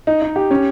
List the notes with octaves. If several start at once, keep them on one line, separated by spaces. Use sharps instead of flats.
D#4
D#4
G4
C#4